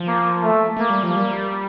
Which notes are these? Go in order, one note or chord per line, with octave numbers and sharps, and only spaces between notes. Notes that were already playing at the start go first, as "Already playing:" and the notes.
Already playing: F3
A#3
A3
A3 A#3
G3
F3
A#3
G3